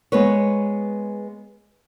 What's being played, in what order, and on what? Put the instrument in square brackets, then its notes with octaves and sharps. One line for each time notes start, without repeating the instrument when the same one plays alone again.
[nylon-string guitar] G#3 B3 B4 C#5